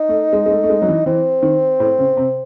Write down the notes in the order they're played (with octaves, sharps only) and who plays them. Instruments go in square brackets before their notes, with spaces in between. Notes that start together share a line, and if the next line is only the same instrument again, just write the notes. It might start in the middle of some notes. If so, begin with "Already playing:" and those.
Already playing: [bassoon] D#4
[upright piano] A3
G#3
G#3
A3
A3
G#3
F#3
E3
[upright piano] E3 [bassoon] C4
[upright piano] D#3
A2
C#3
C3